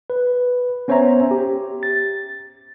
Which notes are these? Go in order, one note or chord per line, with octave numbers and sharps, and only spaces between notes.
B4
B3 C#4 C5 C#5 E5 A#5
G4
A6